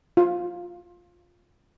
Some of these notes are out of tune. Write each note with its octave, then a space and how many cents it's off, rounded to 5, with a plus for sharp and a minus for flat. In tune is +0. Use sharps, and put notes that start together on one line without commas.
F4 +10